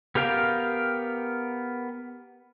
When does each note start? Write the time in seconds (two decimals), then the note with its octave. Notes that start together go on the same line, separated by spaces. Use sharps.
0.15 B3 G4 A#4 F5 G5